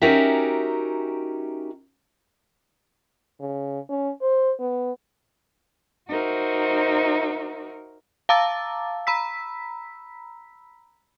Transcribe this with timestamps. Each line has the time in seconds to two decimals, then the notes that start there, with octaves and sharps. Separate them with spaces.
0.02 C#4 D#4 F#4 G4 A#4 E5
3.40 C#3
3.90 C#4
4.22 C5
4.60 B3
6.08 D#4 F#4 A#4 C5 E5
8.29 F5 A5 A#5 D6 E6 A6
9.07 A#5 B5 E6 B6